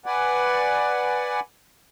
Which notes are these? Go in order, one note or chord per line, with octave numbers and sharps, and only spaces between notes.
B4 D5 F#5 G#5